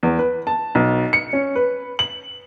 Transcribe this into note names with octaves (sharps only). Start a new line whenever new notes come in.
E2
B4
A5
B1
C#7
C#4
B4
F#7